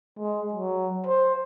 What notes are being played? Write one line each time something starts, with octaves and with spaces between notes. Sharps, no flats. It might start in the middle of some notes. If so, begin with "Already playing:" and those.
G#3
F#3
C5